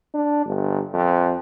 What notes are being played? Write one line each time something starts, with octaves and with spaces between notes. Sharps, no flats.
D4
G1
F2